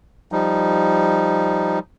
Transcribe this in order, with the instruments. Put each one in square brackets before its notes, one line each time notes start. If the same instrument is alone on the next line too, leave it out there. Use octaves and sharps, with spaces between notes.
[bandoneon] F3 G3 D#4